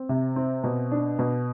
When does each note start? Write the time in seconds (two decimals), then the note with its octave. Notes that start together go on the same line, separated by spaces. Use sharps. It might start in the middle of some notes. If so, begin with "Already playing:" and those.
Already playing: C4
0.09 C3
0.36 C4
0.64 B2
0.92 D4
1.19 B2